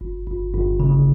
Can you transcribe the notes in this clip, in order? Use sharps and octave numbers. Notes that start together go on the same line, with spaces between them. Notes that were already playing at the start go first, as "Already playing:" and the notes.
G1
G1
G1
C#3